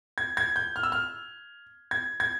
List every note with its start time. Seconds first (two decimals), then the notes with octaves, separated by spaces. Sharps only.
0.18 G#6
0.37 G#6
0.56 G6
0.76 F6
0.83 E6
0.92 F6
1.91 G#6
2.20 G#6